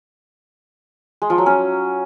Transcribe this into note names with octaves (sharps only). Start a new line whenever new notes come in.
G#3
F3
F#3
C#4